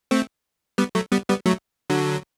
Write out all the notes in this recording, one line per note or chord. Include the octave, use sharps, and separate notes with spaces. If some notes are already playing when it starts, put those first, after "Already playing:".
A3 C4
G3 B3
F#3 A3
G3 B3
G3 B3
F#3 A3
D3 F#3